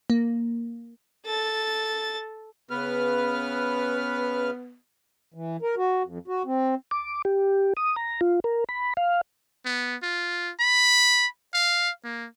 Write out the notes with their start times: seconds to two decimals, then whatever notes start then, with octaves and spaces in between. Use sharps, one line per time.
0.10 A#3
1.26 A4 A6
2.70 C#3 B3 B4 F6
5.34 E3
5.62 A#4
5.77 F#4
6.03 F2
6.28 F#4
6.46 C4
6.91 D6
7.25 G4
7.77 D#6
7.96 A#5
8.21 F4
8.44 A#4
8.69 B5
8.97 F5
9.65 B3
10.03 F4
10.60 B5
11.54 F5
12.04 A#3